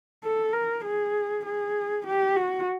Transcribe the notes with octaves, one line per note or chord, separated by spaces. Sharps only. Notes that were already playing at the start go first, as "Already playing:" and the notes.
A4
A#4
G#4
G#4
G4
F#4